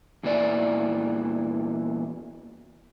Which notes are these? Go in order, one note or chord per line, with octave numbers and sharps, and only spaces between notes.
E2 A#2 E3 D5